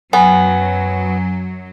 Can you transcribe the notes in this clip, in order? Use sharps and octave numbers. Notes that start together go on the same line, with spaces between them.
F#2 F#3 B3 G#5